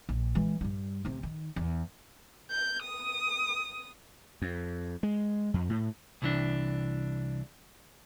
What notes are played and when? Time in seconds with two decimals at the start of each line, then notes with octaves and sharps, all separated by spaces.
0.09 A#1
0.35 E3 G#3
0.61 G2 G3
1.05 D2 C3
1.23 D#3
1.56 E2
2.51 G6
2.84 D#6
4.42 F2
5.03 G#3
5.54 F2
5.69 A2
6.22 C2 E3 D4